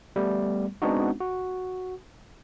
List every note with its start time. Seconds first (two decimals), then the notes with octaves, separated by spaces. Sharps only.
0.16 G3 A3 B3
0.82 G#3 B3 C4 D4 D#4 F#4
1.21 F#4